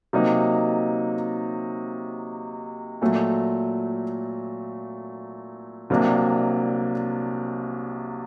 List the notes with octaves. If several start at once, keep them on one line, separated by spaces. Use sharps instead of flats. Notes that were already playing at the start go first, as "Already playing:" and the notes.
C3 F#3 A#3 D#4
A#2 F#3 A3
C2 C3 F#3 A#3 D4